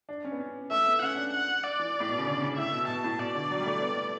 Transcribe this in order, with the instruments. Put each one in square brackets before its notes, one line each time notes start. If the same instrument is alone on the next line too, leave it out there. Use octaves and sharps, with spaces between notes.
[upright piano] D4
C#4
B3
C#4
[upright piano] A3 [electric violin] E5
[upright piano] B3
[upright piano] C#4 [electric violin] F#5
[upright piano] D4
[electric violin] F#5
D5
[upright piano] E3
A2
B2
C#3
D3
C#3
[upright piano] A2 [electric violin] E5
[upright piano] B2
[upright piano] B2 [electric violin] A5
[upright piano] A2
[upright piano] B2 [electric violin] D5
[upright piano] D3
F#3
G3
A3
B3
G3
A3